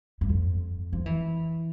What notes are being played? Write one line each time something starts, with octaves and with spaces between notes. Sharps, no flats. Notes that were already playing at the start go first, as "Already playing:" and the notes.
G2
F2
F3
E3